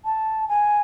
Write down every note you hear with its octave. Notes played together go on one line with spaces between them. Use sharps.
A5
G#5